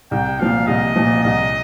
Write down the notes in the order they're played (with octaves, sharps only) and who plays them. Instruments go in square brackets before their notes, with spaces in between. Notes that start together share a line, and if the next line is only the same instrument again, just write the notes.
[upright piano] C2 [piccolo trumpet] G5
[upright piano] A#2 F3 [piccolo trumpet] F5
[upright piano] C2 [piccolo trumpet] D#5
[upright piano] A#2 F3
[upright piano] C2 [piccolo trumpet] D#5